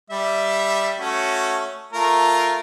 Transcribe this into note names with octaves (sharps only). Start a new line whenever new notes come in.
G3 E5
A3 C#4 F#4
A3 F4 A#4